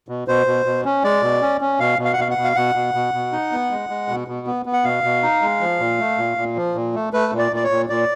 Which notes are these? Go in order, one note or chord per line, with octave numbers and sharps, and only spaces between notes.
B2
B2 C5
B2
B2
C#4
G#3 D5
B2
C#4
C#4
B2 F5
B2
F5
F#5
B2 F5
F#5
B2
F5
B2 F#5
B2
B2
B2
D#4
B3
G#3
G#3
B2
B2
B3
B3
F#5
B2 F5
B2
D#4
G#3
F3
A#2
A3
A#2
A#2
F3
A#2
A3
A3 B4
A#2
D5
A#2 D5
C#5
A#2
A#2 D5